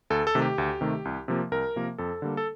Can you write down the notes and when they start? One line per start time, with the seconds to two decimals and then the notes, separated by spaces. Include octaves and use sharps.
0.10 D2 A4
0.27 A4
0.35 C3 D#3 A3
0.42 G4
0.58 D2
0.81 C3 D#3 A3
1.05 C2
1.28 C3 F3 A#3
1.51 C2 A#4
1.76 C3 F3 A#3
1.98 F2 A4
2.22 D3 G3 A#3
2.37 A4